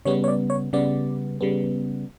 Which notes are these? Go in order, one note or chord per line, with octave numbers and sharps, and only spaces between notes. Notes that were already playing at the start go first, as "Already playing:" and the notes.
C#3 G3 B3 C#5
C#5
D5
C#5
C#3 G3 B3 D5
C#3 G3 B3